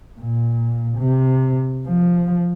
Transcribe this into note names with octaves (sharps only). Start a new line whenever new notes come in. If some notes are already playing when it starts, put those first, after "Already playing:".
A#2
C3
F3